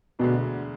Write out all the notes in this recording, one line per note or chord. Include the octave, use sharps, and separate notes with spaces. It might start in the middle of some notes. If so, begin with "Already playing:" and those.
E1 D2 B2 D3